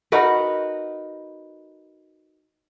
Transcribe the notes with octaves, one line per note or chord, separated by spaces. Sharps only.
D#4 F#4 A#4 B4